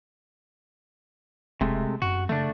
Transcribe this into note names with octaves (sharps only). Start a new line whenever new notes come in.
E1 C3 G#3 A3
F#2 F#4
C#3 A3 D4